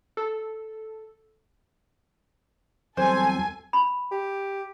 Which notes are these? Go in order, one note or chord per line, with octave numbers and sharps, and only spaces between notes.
A4
E2 F#3 G3 C4 A4 C5 G#5
B5
G4